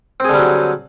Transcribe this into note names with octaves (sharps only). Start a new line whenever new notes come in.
D3 F#3 G3 C4 G#4